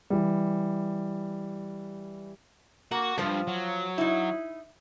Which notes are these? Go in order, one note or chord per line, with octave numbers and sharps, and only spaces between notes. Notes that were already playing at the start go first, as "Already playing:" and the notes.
E3 G3
A#3 F#4
G2 F3 F4 C5
F#3
D#4 E4